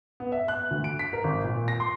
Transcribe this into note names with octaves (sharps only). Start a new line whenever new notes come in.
B3
E5
F#6
D2
D7
B6
A#4
G#1
A#2
A#6
C6